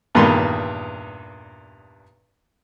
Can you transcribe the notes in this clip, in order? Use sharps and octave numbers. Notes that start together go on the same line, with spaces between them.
E2 G2 A#2 D#3 B5 C6